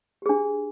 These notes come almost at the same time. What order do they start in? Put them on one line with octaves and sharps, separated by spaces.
G4 G#4 D4